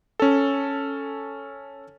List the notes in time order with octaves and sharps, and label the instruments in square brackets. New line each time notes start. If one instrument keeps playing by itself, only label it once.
[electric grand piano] C#4 A4